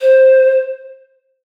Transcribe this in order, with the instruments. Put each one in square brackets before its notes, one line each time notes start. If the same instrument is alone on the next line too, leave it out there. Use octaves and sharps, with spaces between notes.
[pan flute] C5